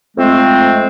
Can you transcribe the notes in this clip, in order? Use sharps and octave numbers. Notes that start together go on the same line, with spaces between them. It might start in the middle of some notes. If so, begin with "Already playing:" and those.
F2 G#3 A3 C4